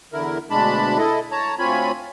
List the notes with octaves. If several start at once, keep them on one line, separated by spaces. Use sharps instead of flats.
E2 D3 E4 A#4
D2 B2 G#3 D4 A5 B5
E4 A4 D#5
C#5 A5 A#5
D2 C4 F4 C#5 G#5 B5